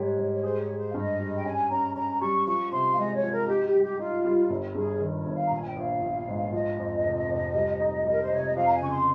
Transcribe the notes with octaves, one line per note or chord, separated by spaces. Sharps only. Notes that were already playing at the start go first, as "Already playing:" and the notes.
Already playing: G#2 G3 G4 C#5
G#2
C#5
G#4 C5
C#5
G#4
C5
F5
G2 D#5
G3
G5
C#4 G#5
C#4 A#5
C#4 A#5
G3 C#6
F3 C#6
C3 C6
F5
G#3 D#5
C#5
F3
A#4
D#4 G4
G4
G3
G4
D#4 F4
G3
G1
G2 G#4
D#3
C#5
G1
F5
A#5
A#1 G#5
G5
A#1 F5
A#1
G#2
F3 D#5
F2
F1
F1
G3
D#4
G3
A#4
C5
C3 C#5
D#5
F2 F5
A#5
G#5
C#3 C#6
C6